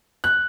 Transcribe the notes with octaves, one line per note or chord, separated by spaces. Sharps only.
F#6